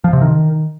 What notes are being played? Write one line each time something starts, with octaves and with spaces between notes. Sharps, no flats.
F3
C3
D#3